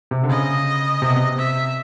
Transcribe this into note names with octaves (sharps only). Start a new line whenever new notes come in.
C3
D3
C#3 D#5
C3
B2
C3
E5